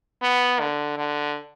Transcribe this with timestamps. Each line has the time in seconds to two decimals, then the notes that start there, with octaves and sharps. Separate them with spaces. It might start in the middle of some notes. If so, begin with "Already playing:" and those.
0.22 B3
0.60 D3
0.98 D3